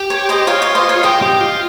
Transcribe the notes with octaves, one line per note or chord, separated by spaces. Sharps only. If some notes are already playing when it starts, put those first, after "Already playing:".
Already playing: G4
C#5
C5 D#5
F4 C#5 F5
C#5 F5
C5 D#5
C#5 F5
G4 D#5 G5
G4
F4